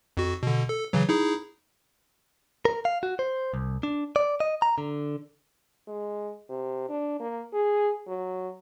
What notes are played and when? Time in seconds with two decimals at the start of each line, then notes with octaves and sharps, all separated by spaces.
0.17 F2 F#4
0.43 B2 D3
0.69 A4
0.93 C#3 E3 F#3
1.09 D#4 E4 G#4
2.65 A#4
2.85 F5
3.03 F#4
3.19 C5
3.54 C2
3.83 D4
4.16 D5
4.40 D#5
4.62 A#5
4.78 D3
5.88 G#3
6.49 C3
6.89 D4
7.20 A#3
7.53 G#4
8.07 F#3